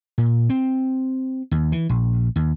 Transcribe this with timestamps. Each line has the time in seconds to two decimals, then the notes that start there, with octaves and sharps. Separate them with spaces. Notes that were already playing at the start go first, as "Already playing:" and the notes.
0.18 A#2
0.50 C4
1.51 D#2
1.72 E3
1.89 A#1
2.36 D#2